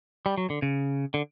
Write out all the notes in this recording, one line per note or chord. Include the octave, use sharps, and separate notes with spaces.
G3
F#3
D3
C#3
D3